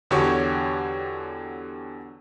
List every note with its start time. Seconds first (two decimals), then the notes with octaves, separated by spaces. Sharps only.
0.11 E2 D3 F#4 G4 C#5 C#6